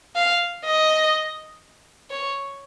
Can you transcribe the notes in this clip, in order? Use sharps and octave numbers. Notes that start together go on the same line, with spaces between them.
F5
D#5
C#5